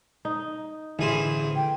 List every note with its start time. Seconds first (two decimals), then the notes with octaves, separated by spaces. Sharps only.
0.25 D#4
0.99 A1 D3 E3 E4 G#4 C5
1.56 G5